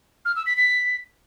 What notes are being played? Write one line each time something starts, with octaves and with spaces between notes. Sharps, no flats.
F6
E6
B6
B6